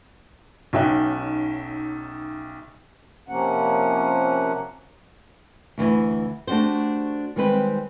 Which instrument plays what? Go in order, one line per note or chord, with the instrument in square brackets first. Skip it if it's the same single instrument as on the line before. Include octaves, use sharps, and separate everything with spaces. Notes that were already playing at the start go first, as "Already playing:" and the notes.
[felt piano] B1 C#4 D#4 E5 G5 F#6
[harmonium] C3 F3 A#3 C#4 F#5
[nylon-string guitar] D2 E3 E4
A3 D4 F#4 G4 C5
D#3 G3 G#3 C4 B4 C5